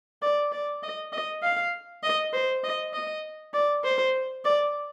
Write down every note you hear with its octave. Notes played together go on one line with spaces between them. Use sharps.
D5
D5
D#5
D#5
F5
D#5
C5
D#5
D#5
D5
C5
D5